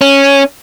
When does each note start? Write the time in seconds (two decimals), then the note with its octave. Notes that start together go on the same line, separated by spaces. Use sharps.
0.01 C#4